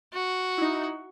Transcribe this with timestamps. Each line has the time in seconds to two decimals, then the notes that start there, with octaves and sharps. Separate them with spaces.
0.13 F#4
0.58 D#4 E4